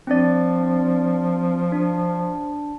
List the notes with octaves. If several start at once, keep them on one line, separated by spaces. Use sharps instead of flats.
F3 C4 D4 D5
D4